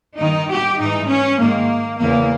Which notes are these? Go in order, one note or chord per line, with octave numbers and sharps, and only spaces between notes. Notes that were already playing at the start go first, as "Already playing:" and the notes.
G2 D#3 D#4
G4
G#2 E3 D#4
C#4
G#2 D#3 A#3
E2 C#3 E3 A#3